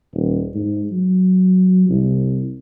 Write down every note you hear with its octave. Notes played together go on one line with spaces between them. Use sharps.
D#1
G#2
F#3
C2